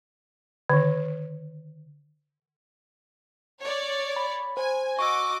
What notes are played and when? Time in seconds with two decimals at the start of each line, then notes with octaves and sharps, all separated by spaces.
0.69 D3 D#3
3.62 C#5 D5
4.16 B5
4.57 C5 G#5
4.99 F#4 D#5 C#6 D6 E6